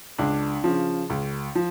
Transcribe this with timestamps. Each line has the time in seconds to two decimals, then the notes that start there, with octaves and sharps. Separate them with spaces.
0.18 C#2 D4
0.64 C#3 F3
1.10 C#2
1.55 F3